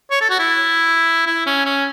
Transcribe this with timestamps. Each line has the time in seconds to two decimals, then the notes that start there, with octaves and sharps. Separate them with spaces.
0.11 C#5
0.21 A4
0.30 F#4
0.39 E4
1.27 E4
1.46 C#4
1.65 C#4